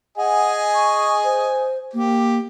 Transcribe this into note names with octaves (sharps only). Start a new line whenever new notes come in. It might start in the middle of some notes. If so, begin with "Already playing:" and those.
G#4 D#5 F#5 G#5
C#6
C5
A#3 G4